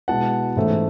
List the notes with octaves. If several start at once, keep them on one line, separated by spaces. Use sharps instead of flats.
B2 G#3 B3 E4 F#5 A5
G#2 E3 A3 C#4